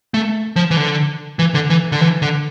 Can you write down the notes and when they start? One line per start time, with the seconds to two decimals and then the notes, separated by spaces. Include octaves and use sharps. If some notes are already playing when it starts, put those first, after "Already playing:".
0.14 A3
0.56 F3
0.71 E3
0.77 D3
1.39 E3
1.54 D3
1.70 E3
1.92 D3
2.01 E3
2.22 D3